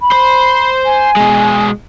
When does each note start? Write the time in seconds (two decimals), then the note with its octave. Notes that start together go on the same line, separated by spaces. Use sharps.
0.01 B5
0.12 C5
0.85 G#5
1.17 B2 G#3